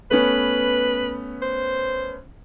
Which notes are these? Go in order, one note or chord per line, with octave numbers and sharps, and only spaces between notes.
A3 B3 C#4 B4
C5